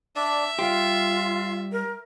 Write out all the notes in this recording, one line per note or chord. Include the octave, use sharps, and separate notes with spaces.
D4 D5 E5
G3 F4 G4 C6
A#4